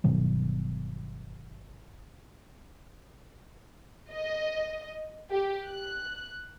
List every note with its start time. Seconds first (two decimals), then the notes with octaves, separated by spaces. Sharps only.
0.04 G1 B2 D#3 F#3
4.12 D#5
5.31 G4
5.67 F#6